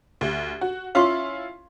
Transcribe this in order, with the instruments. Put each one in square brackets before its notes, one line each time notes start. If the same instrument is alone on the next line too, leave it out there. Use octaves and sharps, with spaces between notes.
[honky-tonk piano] D2 [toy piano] G4
[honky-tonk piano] F#4
[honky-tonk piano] C#4 E4 F4 [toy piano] F5 C6 C#6